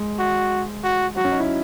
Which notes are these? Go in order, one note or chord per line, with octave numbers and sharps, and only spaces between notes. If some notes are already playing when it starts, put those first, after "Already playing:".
Already playing: G#3
F#4
F#4
F#3 F#4
C#4
D#4
E4